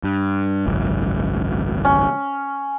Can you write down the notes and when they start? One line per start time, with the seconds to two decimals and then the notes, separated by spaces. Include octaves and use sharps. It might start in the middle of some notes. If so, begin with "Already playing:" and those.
0.04 G2
0.67 G#1 C#2 F#2
1.85 C#4